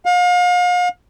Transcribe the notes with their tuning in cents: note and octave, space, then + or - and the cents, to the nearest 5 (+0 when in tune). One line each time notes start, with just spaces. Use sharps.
F5 +40